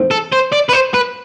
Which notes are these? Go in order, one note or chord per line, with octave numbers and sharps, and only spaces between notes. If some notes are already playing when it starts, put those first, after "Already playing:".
Already playing: G#2 E3 A3 C4
A4
C5
D5
B4
C5
B4